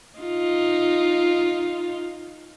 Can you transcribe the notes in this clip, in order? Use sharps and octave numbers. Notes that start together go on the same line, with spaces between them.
D#4 F4